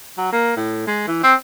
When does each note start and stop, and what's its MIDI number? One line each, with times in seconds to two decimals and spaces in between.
0.18 0.30 54
0.33 0.56 58
0.56 0.82 45
0.87 1.07 56
1.07 1.19 52
1.23 1.34 60